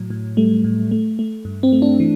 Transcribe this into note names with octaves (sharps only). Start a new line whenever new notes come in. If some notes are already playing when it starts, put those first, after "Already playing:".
Already playing: A2 F#3
A2
G3 A3
A2
A3
A3
G2
C4
A3
D4
E3